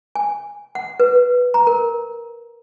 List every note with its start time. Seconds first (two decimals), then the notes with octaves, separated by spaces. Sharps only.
0.15 G#5
0.75 F#5
1.00 B4
1.54 A#5
1.67 A#4